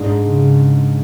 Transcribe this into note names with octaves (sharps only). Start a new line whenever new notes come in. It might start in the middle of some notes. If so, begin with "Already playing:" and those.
Already playing: G#2 G#3 D4
C#3